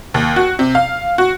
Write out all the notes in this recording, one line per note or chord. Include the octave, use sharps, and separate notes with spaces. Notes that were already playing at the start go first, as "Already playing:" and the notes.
D#2
F#4
C3
F5
F#4